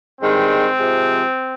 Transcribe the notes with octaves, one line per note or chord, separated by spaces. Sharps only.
G2 D#3 G#3 C4
C3 F3 G#3